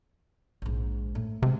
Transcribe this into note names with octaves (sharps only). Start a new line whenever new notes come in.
A#1 G#2
A2
C3 G#3